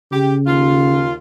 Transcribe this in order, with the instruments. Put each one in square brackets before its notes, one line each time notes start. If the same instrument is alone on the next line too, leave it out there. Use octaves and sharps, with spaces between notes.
[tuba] C#3 [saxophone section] G4
[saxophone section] D#2 F4